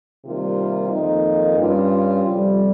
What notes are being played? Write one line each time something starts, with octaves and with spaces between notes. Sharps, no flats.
C3 D#3 G3 A#3 F4
F2 D#3 A#3 D#4
G2 G3 C#4 F4
F2 C3 G3